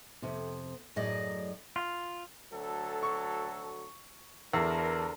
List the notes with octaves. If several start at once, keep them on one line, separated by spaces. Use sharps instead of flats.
F2 C3
F#2 A2 F#3 G#4 D5 D#5
F4
D2 F#3 A4
C#6
E2 D3 A4 A#4